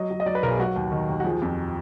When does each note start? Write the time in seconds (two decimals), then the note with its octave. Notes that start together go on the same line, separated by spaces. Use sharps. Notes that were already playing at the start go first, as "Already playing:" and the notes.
Already playing: F#3 D#5
0.11 F#3
0.20 D#5
0.26 F#3 D5
0.35 B4
0.43 B1 A#4
0.50 G#4
0.59 F#3 F#4
0.76 D#2
0.92 D#3
1.09 D#2
1.20 F#4
1.24 F3 G#4
1.42 F2